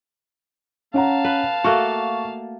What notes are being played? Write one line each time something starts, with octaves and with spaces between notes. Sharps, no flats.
C#4 F5 F#5 A5 A#5
B4
A3 A#3 F#4 C#6